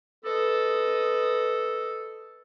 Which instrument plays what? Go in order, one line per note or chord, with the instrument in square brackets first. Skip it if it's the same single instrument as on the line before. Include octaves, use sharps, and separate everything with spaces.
[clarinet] A4 [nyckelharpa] B4 D#5